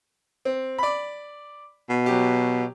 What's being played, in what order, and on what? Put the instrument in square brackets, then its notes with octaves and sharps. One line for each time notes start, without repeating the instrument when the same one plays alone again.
[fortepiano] C4
D5 B5
[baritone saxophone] B2
[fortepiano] F#3 G4